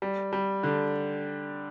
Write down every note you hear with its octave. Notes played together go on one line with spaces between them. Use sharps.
G3
G3
D3